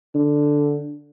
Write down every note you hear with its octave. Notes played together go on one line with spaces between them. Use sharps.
D3